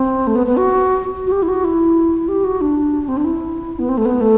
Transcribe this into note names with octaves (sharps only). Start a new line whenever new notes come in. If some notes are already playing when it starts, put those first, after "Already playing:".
Already playing: C4
A3
B3
B3
F#4
F#4
G4
E4
F#4
E4
G4
F#4
D4
C4
D4
E4
B3
C4
A3
B3
A3